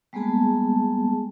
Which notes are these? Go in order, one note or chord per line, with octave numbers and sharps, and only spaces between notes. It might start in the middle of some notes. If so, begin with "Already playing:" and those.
G3 G#3 A#3 B3 G#4 A5